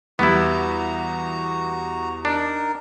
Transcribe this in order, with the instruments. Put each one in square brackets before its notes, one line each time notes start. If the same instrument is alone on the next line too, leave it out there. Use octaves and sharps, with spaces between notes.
[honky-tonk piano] E2 G3 [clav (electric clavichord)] B3 E4 [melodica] F#4 A#5
[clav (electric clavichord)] D4 [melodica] D#4 A#4